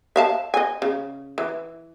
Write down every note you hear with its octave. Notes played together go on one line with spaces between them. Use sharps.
E5 F5 A5
D#5 G#5
C#3
E3